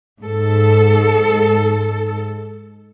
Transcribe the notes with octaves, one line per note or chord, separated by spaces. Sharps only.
G#2 A4